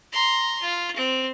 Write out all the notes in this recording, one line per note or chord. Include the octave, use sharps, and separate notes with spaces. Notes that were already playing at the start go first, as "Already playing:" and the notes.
A#5 C6
F4
C4